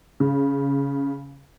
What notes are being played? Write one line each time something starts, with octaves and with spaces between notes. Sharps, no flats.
C#3